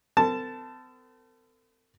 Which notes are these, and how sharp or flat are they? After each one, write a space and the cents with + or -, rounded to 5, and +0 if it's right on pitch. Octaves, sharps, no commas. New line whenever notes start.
C4 -45 A4 +45 A5 +0